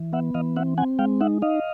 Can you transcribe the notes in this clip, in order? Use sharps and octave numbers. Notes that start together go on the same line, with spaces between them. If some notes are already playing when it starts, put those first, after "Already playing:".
Already playing: E3
B3 E5 F#5
E3 D#5 F5
C4 E5 F#5
C4 F#5 G#5
G#3 F5 G5
D#4 E5 F#5
D#4 D#5 F5